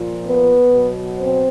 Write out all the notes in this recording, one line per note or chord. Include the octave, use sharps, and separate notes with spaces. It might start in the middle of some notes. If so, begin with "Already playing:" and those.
Already playing: A#2 F3
B3 B4
B2 F#3
C4 C5